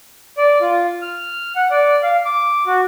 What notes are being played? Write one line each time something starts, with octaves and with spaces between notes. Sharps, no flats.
D5
F4
F6
F#5
D5
F5
D6
F#4